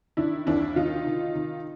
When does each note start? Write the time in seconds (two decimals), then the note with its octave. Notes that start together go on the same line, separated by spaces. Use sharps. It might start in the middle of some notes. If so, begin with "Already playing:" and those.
0.17 D#3 D4 E4
0.47 D#2 D4 E4
0.76 D#3 D#4 F4
1.07 D#3
1.35 D#3